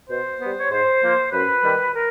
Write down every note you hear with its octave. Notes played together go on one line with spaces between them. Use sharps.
B2 C5
G3 B3
C#5
G#2 C5
F3 A#3
F#2 B4
D#3 G3
A#4